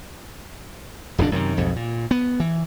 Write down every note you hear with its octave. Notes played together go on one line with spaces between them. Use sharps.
D#1 F2 G#2 D4
F#2 C3 D#3
B1 F2 G#2
A#2
B3
E3